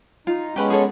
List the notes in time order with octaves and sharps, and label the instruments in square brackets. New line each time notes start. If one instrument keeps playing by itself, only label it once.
[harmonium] D#4 [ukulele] F4
[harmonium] G#3 B3 C#4 [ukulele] G4 B4 B5
[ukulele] G#4 A4 C#5